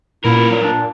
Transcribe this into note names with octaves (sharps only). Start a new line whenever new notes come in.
A#2 B3 E4 A#4
F#3
D4